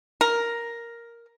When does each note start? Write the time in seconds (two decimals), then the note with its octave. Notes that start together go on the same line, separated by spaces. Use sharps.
0.21 A#4